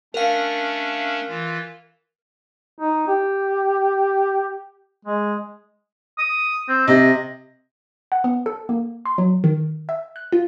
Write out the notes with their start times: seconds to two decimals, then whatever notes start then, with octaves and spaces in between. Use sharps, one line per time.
0.14 A3 C#4 D4 A#4 F5
1.28 E3 F4
2.79 D#4
3.08 G4
5.05 G#3
6.18 D#6
6.69 C4
6.88 C3 D#5
8.12 F#5
8.24 B3
8.46 A4
8.69 A#3
9.06 C6
9.18 F#3
9.44 D#3
9.89 E5
10.16 F#6
10.32 F4